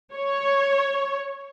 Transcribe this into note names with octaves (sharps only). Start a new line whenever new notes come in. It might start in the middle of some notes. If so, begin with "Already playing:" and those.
C#5